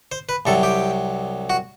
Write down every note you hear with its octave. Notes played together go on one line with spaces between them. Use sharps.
C5
B4
C2 C3 F#3 A4
G4
F#4